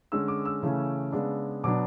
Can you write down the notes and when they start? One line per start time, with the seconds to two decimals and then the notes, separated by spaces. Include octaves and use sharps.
0.12 D3 G#3 C#4 E6
0.28 D6
0.45 E6
0.63 C#3 E3 A3 C#4
1.13 C#3 G#3 B3 D4
1.64 B2 F#3 B3 D4 D6